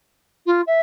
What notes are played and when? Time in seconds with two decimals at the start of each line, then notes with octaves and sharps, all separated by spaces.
0.46 F4
0.67 E5